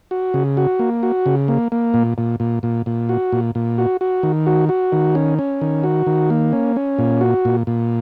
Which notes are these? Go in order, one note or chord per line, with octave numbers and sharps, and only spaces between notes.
F#4
C#3
F#4
A#3
F#4
C#3
A#3
A#3
A#2
A#2
A#2
A#2
A#2
F#4
A#2
A#2
F#4
F#4
D#3
F#4
F#4
D#3
C#4
C#4
D#3
F#4
D#3
A#3
C#4
C#4
A#2
F#4
A#2
A#2